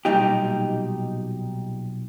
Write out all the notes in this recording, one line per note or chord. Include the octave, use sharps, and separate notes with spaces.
B1 A#2 G3 D#4 G4